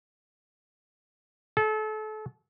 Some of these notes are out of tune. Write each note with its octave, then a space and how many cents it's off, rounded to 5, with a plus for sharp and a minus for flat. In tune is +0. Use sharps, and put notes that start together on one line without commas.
A4 -35